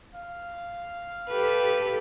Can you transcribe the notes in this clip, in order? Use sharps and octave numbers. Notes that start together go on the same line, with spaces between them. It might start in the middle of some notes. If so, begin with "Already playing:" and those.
F5
G4 A4 B4